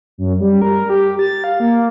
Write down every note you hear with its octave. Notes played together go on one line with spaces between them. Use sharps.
F#2
G3
A#4
G4
A6
F5
A#3